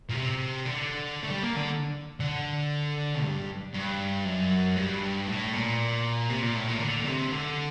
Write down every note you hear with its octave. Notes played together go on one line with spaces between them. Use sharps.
A#2
C3
D3
A3
G3
A#3
D3
D3
G2
G2
F#2
G2
A2
A#2
C3
A#2
A2
A#2
D#3
D3
A#2
C3
D3